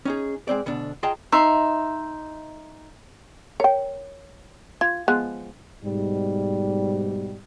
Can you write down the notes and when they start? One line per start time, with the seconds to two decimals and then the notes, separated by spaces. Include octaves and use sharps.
0.05 C#4 D#4 G#4
0.48 G#3 A#3 C4 D5
0.66 D2 B2 D3 D4
1.03 F4 G#4 D#5 G5 A5 A#5
1.32 D#4 E5 C6
3.60 A#4 C#5 G5
4.81 F4 G#6
5.08 F3 G#3 B3 F#6
5.84 G#2 B2 G3